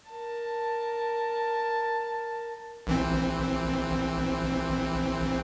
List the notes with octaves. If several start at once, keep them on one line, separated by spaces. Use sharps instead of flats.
A#4 A5
A#1 E3 C4